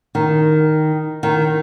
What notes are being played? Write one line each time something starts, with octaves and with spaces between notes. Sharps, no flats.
D#3
D#3